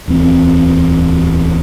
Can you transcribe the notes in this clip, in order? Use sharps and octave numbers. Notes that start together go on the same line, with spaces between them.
D1 E2 C4